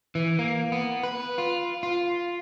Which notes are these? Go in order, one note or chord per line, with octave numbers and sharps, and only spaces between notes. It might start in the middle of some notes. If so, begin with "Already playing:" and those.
E3
A#3
B3
B4
F4
F4